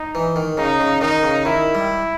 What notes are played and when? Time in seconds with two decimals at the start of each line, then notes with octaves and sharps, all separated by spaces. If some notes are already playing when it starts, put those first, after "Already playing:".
Already playing: D#4
0.15 E3
0.36 D#3
0.57 C#3 D#4
0.80 C#3
1.01 D#3 D#4
1.23 C#3
1.45 D#3 E4
1.75 G3